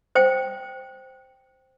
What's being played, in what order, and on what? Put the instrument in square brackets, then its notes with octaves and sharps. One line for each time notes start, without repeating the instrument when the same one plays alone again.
[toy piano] C5 G5